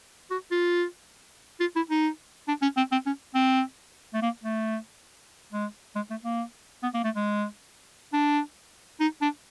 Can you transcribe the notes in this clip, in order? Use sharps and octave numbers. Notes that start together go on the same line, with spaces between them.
F#4
F4
F4
E4
D#4
D4
C#4
C4
C4
C#4
C4
A3
A#3
A3
G#3
G#3
A3
A#3
B3
A#3
A3
G#3
D4
D#4
D4